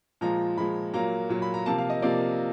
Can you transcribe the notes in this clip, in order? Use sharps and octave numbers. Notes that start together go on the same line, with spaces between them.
A#2 F3 G#3 A#5
A#2 F3 G#3 B5
A#2 F#3 A#3 A#5
A#2 F#3 A#3
B5
A#5
C3 F3 A#3 A5
F5
D#5
C3 F3 A#3 D5